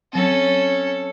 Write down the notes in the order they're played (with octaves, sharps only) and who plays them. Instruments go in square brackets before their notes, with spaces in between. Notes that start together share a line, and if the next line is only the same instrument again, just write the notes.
[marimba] F#3 C4 [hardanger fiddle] C#4 A4